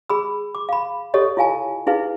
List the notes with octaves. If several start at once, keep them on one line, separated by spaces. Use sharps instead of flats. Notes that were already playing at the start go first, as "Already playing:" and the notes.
G#4 B5 E6
D6
F5 B5
G4 A4 C#5 D#5
E4 F4 F5 G#5 A5
D#4 E4 G#4 B4 F5